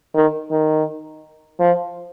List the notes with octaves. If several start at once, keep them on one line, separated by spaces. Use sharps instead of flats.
D#3
D#3
F3